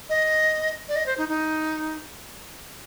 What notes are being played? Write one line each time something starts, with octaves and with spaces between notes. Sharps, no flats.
D#5
D5
D#5
C5
D#4
D#4